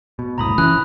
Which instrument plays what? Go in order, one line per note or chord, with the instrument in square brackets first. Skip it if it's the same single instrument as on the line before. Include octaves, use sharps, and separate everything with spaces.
[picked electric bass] B2
[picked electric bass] F#1 C2 A2 [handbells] A#5 B5 D#6
[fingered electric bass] E3 [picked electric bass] C#4 [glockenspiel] F#6